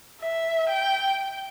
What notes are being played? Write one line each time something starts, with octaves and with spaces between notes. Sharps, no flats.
E5
G5